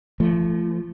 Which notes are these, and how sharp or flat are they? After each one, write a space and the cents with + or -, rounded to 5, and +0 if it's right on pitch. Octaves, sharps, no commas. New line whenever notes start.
F3 -35 A3 +0